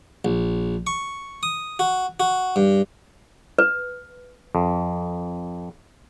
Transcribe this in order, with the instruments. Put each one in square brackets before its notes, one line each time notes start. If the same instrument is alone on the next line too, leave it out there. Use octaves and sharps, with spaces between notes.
[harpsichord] A#1
C#6
D#6
F#4
F#4
G2
[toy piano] B4
[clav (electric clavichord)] F2